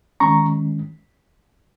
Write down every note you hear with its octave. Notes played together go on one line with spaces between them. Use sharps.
D#3 G#3 C#4 A#5 C#6